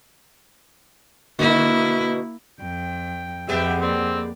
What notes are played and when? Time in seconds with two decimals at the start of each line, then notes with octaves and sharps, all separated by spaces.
1.39 B2 D3 A#3 E4 F#4
2.60 F2 G5
3.48 F2 G#3 B3 G4 E5 G5
3.81 A#3 C4 D5